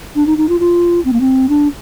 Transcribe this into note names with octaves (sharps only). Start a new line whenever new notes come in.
D4
D#4
D#4
F4
F4
C4
A#3
C4
D4